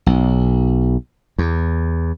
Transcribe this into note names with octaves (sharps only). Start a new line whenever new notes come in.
B1
E2